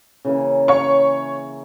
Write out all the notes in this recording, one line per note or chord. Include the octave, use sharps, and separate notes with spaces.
C#3 E3 A#3
C#5 C#6